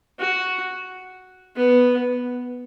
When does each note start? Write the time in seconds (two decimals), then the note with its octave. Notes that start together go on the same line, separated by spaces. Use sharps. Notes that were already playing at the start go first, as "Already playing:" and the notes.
0.20 F#4
1.56 B3